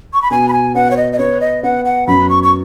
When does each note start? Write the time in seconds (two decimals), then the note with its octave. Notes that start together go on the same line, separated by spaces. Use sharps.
0.13 C#6
0.22 B5
0.31 B2 G#5
0.49 B5
0.53 G#5
0.75 B3 F#5
0.91 C#5
0.97 D#5
1.13 D#5
1.19 B3 C#5
1.41 D#5
1.63 B3 F#5
1.85 F#5
2.07 F#2 B5
2.29 C#6
2.43 C#6